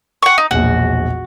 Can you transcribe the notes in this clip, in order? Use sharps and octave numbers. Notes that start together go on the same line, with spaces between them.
F#5 C#6
D#4
E1 A#1 F#4